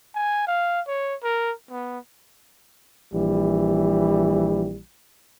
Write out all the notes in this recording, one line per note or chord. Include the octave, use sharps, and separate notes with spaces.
G#5
F5
C#5
A#4
B3
A#1 E3 G3